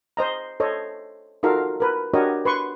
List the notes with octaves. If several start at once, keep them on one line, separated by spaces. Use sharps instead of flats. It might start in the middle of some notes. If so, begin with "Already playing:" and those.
C5 D#5 A#5
A4 C5 C#5 D#5
D#4 F4 F#4 A4 A#4 F5
A#4 B4
D4 F#4 G4 A#4 C#5 D#5
B4 C6 C#6